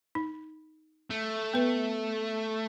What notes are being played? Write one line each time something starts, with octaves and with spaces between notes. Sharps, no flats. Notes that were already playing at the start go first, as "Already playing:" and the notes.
D#4
A3
B3 B4